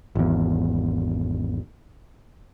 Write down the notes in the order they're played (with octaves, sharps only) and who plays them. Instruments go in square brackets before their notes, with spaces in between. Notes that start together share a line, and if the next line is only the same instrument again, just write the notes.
[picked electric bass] G#1 E2